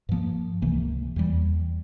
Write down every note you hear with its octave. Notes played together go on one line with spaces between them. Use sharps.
G2 F3 A#3
C#2 C3 E3 A#3
E2 E3 G3